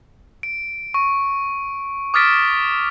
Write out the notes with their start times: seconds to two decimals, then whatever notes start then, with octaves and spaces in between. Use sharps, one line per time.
0.43 D7
0.94 C#6
2.14 D6 D#6 F6 A6 B6 D7